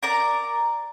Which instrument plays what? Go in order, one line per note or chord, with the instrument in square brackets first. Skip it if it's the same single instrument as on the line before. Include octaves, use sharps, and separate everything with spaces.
[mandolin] A#4 D5 A#5